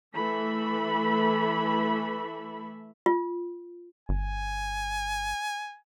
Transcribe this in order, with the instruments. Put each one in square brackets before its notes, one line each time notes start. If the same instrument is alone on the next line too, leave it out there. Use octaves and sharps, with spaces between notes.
[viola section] E3 A3 A4 E5 B5
[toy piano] F4
[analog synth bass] G1 [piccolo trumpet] G#5